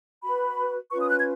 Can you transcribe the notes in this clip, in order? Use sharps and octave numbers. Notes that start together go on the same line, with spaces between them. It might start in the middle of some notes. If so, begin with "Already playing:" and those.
F#4 B4 B5
C#4 F4 B4 C#6
D#6
F#6
G#6